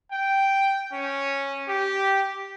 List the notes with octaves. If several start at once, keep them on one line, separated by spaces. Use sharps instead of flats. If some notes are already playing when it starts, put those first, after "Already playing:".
G5
C#4
G4